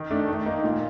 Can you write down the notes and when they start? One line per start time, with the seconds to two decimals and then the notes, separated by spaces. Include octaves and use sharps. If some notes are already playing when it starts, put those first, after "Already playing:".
Already playing: D#3
0.11 A3 D4
0.28 D#3
0.46 A#3 D#4
0.64 A#2